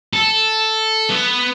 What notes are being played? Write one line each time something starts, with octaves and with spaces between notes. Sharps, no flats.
A4
B3